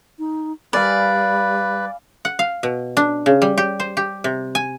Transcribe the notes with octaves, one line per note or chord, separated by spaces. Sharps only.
D#4
G3 B4 D5 F5 G#5 B5
F#5
F5
B2
D4
C#3
G3
G4
C5
G4
C3
G#5